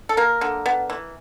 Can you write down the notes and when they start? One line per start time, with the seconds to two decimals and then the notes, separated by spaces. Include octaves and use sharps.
0.09 A4
0.17 A#3 A#4
0.41 D3
0.66 B3
0.90 E3